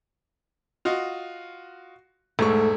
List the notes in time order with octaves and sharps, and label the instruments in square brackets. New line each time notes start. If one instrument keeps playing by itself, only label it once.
[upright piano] F4 F#4 D#5
[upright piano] E1 G#2 C#6 [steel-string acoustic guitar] A3